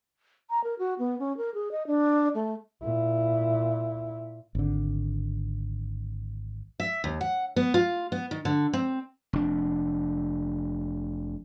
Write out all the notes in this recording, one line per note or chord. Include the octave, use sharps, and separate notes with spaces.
A#5
A#4
F#4
B3
C#4
A#4
G#4
D#5
D4
A3
A#2 E4
G#1 D3
E5
D#2
F#5
B3
F4
B3
D#3
D3
C4
F1 D4